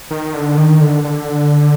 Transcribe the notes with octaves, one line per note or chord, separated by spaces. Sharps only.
D#3
D3
D#3
D3
D3